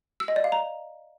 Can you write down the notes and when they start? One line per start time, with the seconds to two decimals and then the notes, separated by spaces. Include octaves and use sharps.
0.20 E6
0.28 D#5
0.36 D5
0.44 F5
0.52 A#5